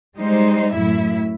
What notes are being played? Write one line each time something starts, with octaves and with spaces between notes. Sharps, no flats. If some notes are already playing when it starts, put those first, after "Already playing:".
G3 G#3 D#4 C5
F#2 A2 E4 E5